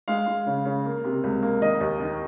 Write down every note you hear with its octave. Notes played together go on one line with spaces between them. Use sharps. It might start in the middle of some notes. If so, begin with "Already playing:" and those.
G#3 F5
G#3
C#3
C#3
A#3
C3
C#2
A#3
D#3 D#5
D#2
D#3